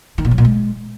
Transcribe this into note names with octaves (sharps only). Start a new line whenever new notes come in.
D#3
A#2
F#3
A#2
G#3